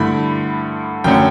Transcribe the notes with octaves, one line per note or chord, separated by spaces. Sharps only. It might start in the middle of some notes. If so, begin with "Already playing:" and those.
Already playing: G2 D3 A3 E4 B5
F#2 D3 A3 C#4 G5